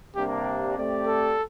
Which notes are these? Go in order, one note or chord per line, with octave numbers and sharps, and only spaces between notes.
C3 G3 A#3 D4 G4
A3 C4 G4 D5
A4